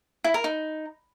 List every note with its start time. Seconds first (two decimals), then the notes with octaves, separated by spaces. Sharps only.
0.24 E4
0.34 A#4
0.44 D#4